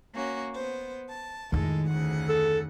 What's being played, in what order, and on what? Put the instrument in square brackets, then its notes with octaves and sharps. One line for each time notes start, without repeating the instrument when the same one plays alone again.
[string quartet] A#3 C#4 F#4
B3 C5
A5
[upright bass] F2 D#3 [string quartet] A2 G#3 A4
[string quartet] D2 C#3 F#5
[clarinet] A4